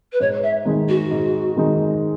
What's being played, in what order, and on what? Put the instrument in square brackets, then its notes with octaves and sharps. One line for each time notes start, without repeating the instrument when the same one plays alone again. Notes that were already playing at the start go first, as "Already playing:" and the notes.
[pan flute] B4
[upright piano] G#2 [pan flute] C#5
[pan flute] E5
[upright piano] D#3 G#3 D#4
[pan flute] F#4
[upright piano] G#2
D#3 G#3 D#4